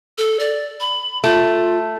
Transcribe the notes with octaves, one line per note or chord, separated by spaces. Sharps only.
A4
D5
B5
A3 F4